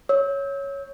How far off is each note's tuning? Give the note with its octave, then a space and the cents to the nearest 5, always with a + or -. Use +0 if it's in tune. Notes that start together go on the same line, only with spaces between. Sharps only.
C#5 +0 E6 -30